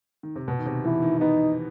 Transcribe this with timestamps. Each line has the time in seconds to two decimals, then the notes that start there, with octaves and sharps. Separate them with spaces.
0.23 D#3
0.36 C3
0.48 B2
0.59 D#3
0.66 C3
0.85 E3 E4
1.03 D#3
1.20 B3 D#4